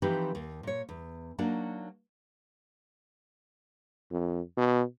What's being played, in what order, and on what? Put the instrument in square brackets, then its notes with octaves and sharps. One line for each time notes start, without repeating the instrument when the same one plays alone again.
[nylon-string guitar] E3 F3 C4 D#4 G4 B4
D#2
A#2 C#5
E2
F#3 A#3 D4 D#4 F#4
[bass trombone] F2
B2